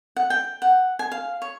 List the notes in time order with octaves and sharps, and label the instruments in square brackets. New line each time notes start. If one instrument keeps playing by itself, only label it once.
[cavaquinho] F#5
G5
F#5
G#5
F5
C#5